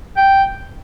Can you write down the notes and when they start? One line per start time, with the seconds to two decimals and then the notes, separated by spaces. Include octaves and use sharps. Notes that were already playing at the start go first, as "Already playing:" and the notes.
0.17 G5